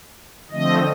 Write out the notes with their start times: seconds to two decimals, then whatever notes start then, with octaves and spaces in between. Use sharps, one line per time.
0.51 D3 F3 A3 C4 D#5